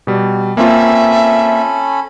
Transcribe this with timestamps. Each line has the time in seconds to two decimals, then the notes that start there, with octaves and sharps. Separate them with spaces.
0.07 B2 G3
0.57 A#3 C4 C#4 F4 A4 E5 B5